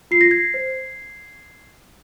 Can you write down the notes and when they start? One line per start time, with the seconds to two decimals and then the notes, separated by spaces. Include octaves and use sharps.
0.11 F4 C7
0.21 A#6
0.31 G#6 C7
0.54 C5